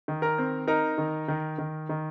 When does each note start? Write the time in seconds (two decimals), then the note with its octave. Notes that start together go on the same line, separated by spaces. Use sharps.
0.08 D#3
0.22 A#4 A#5
0.38 C4
0.67 D#4 A#4 A#5
0.98 D#3
1.28 D#3
1.58 D#3
1.89 D#3